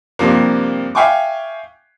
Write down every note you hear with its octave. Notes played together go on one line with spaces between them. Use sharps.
G2 C3 F3 A#3
E5 F5 G5 G#5 C#6 D6